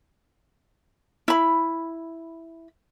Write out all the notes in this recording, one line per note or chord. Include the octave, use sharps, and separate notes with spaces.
E4 B5